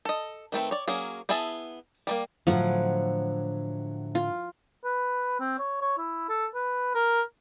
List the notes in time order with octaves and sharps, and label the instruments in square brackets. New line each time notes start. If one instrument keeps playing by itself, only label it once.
[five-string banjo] A4 D#5
D#3 A3 C4 B4
C#5 D5
F#3 A#3 C#4 G#4
B3 E4 G#4 E5 A5
G3 A3 A#3
[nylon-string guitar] A2 D3 F#3 [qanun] F3 F#5
[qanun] F4
[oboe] B4
C4
C#5
C#5
E4
A4
B4
A#4